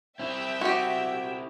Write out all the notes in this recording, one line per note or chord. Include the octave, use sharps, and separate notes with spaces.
C4 E4 E5 G5
F#4 G4